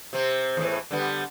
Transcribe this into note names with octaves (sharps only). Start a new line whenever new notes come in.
C3 C4
E2 A2 E3
D3 G3 B3